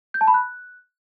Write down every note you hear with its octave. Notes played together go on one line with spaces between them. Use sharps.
G6
A5
B5
F#6